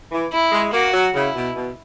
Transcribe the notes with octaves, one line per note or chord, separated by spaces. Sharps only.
E3
E4
G#3
A#3 F#4
F#3
C#3 E4
B2
B2